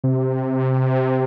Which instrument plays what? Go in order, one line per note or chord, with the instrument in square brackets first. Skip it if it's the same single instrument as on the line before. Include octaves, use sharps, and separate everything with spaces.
[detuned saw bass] C3